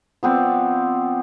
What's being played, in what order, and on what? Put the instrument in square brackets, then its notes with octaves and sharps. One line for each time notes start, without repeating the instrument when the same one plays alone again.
[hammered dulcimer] F3 B3 C4 D5